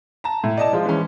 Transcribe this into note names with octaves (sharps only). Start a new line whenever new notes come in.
A5 A#5
A2
D5 D#5 A5
F3 G#3 F4
E3 G#3 C#4